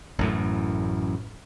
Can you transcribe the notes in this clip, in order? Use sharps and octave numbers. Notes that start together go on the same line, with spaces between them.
A1 F#2 A2